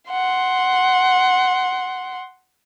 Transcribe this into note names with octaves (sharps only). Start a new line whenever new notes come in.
F#5 C6